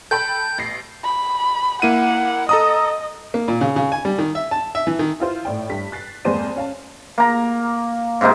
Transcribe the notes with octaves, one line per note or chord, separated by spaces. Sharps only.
A4 G5 B5 G6
A1 A#6 C7
B5
A#3 E4 F#5 D#7
A4 D#5 A#5 D#6
A#3
A#2
C#3
C#3
G#5
G3
D#3
E5
A5
E5
E3
D#3
E4 F4 C5
A2 D5 G5
G2 B6
F#6 A6 C7
F2 G#3 A#3 C5 D5 D#7
C#4 F5 A5
A#3 A#5
G#2 C3 A#3 D#4